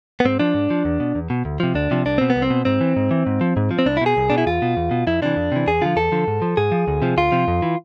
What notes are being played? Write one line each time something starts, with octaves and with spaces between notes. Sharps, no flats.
B3
G#2 C4
F3 D4
G#2
F3
E2
B2
E2
B2
D2
C3 F3
D2 D4
C3 F3
C2 D4
B2 C4
B3
C2
C4
B2
G#2 C4
E3
G#2
E3
G#2
F3
G#2
F3
C4
C2 D4
E4
B2 G#4
C2
B2 D4
E4
E2 F4
B2
E2
B2
F2 E4
C3 E3 D4
F2
C3 E3
E2 G#4
D3 F3 F4
E2 A4
D3 F3
G#2
F3
G#2 G#4
F3
D2
C3 F3
D2 F4
C3 F3
F2
E3